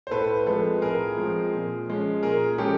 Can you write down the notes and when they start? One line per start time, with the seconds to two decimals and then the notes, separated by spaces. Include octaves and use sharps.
0.07 C5
0.11 A2 A4 B4
0.46 F3 G#3 C4 A4 B4
0.82 A2 G#4 A#4
1.17 F3 G#3 C4
1.53 A#2
1.88 F3 G#3 C#4
2.23 A#2 G#4 A#4
2.58 F3 G#3 C#4 G4 A4